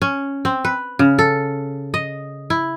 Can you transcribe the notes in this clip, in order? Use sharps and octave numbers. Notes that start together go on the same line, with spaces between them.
C#4
C4
B4
C#3
A4
D#5
E4